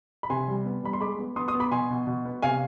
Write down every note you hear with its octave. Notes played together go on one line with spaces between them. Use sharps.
B5
C3 G#5 C6
G3
B3
G3 B5
C6
G#3 B5 D6
B3
B3 C6 D#6
C6 D#6
B3
B5 D6
B2 G#5 C6
B2
B2
B3
C3 F5 G#5